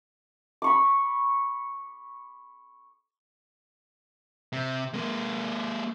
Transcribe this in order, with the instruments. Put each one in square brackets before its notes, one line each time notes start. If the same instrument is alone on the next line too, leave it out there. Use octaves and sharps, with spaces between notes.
[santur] B5 C#6 D6
[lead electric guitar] C3
G#3 A#3